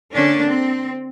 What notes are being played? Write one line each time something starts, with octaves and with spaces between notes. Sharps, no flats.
D3 A#3 C#4 D4
C4